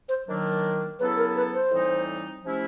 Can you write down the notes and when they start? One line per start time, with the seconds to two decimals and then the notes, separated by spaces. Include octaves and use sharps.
0.09 C5
0.28 D#3 F#3 A#3 D4
0.99 C#3 F#3 B3 E4 A4 B4
1.17 A#4
1.36 B4
1.54 C5
1.71 A2 E3 G3 C4 D#4
2.44 C3 F3 A3 C#4 E4